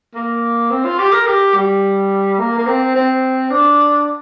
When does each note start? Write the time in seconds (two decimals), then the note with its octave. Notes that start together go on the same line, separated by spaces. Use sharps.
0.14 A#3
0.70 C4
0.85 F4
0.99 G4
1.12 A#4
1.27 G4
1.55 G3
2.39 A#3
2.58 A#3
2.67 C4
2.95 C4
3.51 D4